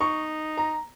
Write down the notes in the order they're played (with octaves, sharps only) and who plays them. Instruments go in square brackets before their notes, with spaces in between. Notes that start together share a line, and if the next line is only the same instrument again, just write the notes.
[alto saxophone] D#4 [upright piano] C#6
[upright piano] A#5